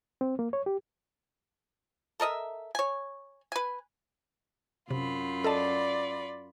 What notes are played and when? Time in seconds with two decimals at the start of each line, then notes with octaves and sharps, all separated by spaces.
0.21 C4
0.39 A#3
0.53 C#5
0.66 G4
2.20 A4 A#4 D#5 E5
2.75 C#5 G#5
3.52 B4 G#5
4.91 F#2 C3 F4 B5
5.44 A4 D5 D#5 A5